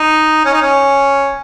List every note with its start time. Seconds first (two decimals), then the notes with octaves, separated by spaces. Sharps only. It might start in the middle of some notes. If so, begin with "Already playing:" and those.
Already playing: D#4
0.45 C#4
0.53 D#4
0.61 C#4